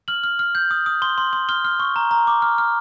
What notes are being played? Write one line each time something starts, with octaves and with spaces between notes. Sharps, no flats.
F6 F#7
F6
F6
G6
D#6
D#6
C6 G7
C6
C6
F6 G7
F6
C#6
A#5
A#5
D6
F6
F6